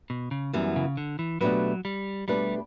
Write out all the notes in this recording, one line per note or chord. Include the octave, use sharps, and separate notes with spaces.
B2
C#3
F#2 E3 G3 B3
C#3
D3
E3
B2 F#3 A3 D4 G4 B4
G3
B2 G3 A3 D4 G4 B4